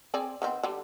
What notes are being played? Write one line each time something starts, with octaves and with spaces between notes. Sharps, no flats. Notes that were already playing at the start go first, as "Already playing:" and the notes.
C4 G#4 D5
D#3 B3 C4
D3 G3